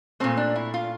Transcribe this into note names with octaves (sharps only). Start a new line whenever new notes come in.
A#2 F3 A3 C4
D4
E4
F4